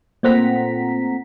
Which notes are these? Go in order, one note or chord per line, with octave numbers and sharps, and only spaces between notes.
A#2 A3 C4 F#5 A#5 B6